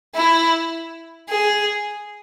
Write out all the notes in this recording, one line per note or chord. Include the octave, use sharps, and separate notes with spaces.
E4
G#4